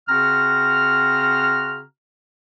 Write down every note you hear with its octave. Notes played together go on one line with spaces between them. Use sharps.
C#3 C4 F#4 A#5 F6